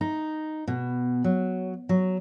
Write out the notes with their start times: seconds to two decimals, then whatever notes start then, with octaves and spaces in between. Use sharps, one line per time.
0.01 D#4
0.68 B2
1.24 F#3
1.89 F#3